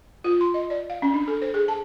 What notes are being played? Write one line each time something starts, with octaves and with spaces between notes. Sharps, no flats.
F4
C6
D#5
D5
F5
C#4
D4
A4
C5
G#4
A5